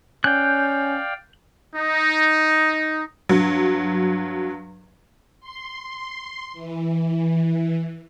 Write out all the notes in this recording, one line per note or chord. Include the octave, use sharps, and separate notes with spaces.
C#4 D5 F5 G5 F#6 G6
D#4
G2 F#3
C6
E3